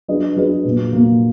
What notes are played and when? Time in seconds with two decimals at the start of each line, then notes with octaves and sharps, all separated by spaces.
0.08 F#3 D4 G#4 B4 D#5
0.36 F#3 D4 G#4 B4 D#5
0.64 A#2 F#3 A#3
0.93 A#2 F#3 A#3